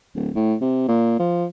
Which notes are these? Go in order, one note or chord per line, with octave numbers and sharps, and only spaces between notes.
D1
A2
C3
A#2
F3